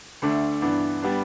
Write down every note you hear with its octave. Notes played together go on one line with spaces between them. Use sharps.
D2 D3 A3 D4
G2 E3 B3 D4
G3 B3 D4